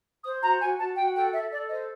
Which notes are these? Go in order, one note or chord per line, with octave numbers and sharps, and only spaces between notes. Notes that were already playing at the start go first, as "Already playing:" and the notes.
C5 D#6
F#4 A#5
F#4 G#5
F#4 A5
F#4 G5
A4 G5
A4 E5
A4 D5
C5 D#5